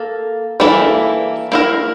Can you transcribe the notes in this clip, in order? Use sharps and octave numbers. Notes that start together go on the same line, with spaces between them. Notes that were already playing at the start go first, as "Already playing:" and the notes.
Already playing: A#3 A4
E3 A#3 E4 A4
A#3 E4 A#4